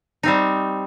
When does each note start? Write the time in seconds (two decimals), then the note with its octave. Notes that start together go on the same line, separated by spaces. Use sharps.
0.23 G3 C4 D#4